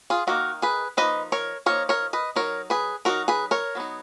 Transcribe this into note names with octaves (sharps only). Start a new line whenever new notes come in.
F4 G#4
D#3 A#3 D#4 F#4 A#4
G#4 B4
F3 A#3 D#4 B4 D#5
A#4 C#5
F3 A#3 D#4 A#4 C#5
A#4 C#5
B4 D#5
F#3 B3 D#4 A#4 C#5
G#4 B4
F#3 B3 D#4 F#4 A#4
G#4 B4
A#4 C#5
F#3 B3 D#4